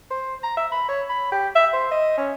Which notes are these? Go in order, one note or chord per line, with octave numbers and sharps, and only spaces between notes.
C5
A#5
E5
B5
C#5
B5
G4
E5
C5
D#5
C#4